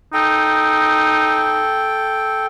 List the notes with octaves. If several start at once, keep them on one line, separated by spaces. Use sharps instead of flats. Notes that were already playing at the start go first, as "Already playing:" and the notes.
D#4 A4 G5